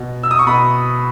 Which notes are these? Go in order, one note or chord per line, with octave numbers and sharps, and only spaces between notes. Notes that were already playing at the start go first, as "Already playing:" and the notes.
Already playing: B2
E6
D#6
C#6
B2 B5